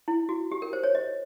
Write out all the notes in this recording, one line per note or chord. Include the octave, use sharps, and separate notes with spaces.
E4
F#4
G4
A#4
C5
C#5
D#5